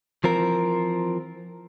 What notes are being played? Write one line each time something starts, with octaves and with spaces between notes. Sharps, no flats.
E3 F3 C4 A#4